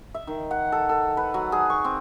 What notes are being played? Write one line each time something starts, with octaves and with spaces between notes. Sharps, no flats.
E5
D#3
F#5
A4
A4
B4
F#3
G#4
C#6
C4